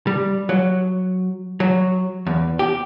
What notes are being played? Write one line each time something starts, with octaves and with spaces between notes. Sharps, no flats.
G3
F#3
F#3
E2
G4